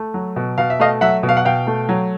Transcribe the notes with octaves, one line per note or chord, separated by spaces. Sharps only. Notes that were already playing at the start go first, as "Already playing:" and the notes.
Already playing: A3
F#3
B2
B2 F5
E5
A3 D#5 F5
F#3 E5 F#5
B2
F5
F#5
B2 F5 G5
A3
F#3